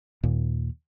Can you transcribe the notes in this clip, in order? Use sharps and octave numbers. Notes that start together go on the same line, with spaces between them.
D#2 A#2 D#3